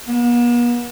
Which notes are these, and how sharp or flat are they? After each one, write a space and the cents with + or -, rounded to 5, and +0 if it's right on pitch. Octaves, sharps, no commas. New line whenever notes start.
B3 -45